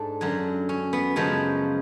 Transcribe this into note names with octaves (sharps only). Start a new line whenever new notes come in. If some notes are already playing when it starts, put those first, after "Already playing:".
Already playing: G#2 D4 A4
F#2 D3 F#3
C#4
B3
F#2 C#3 F3 G#3 B3